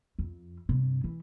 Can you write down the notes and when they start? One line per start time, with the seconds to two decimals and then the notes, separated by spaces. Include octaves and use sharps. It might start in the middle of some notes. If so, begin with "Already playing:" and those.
0.19 F2
0.69 G2 C3
1.04 E3